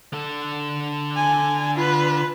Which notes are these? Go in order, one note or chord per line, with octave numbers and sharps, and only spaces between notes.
D3 A4
G#5
F4 B4